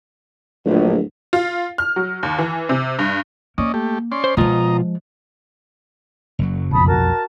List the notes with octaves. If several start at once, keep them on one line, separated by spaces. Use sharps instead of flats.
D1 A#1
F4
F6
F#3
D#2
E3
C3
G2
A#3 C#4 D5 D#5
A3 G4
C#4 D5 C6
C5
B2 F3 G#3 F4 D#5 A#5
F#1 F#2 F#3
F1 B1 F2 A5 B5 D#6
F#4 A#4 A5